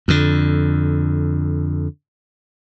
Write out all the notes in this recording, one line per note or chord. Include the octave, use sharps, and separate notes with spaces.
F2 D3